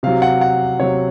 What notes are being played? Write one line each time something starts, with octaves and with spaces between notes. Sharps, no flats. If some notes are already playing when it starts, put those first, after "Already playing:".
C3 F#3 F5
F#5
F#5
C3 F#3 C#5